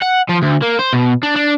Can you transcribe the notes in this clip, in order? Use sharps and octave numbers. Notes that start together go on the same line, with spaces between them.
F#5
F3
D2
A#3
C5
B2
D4
D4